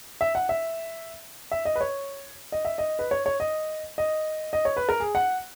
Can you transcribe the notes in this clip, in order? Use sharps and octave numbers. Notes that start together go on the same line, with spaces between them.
E5
F#5
E5
E5
D#5
B4
C#5
D#5
E5
D#5
B4
C#5
C#5
D#5
D#5
D#5
C#5
B4
A#4
G#4
F#5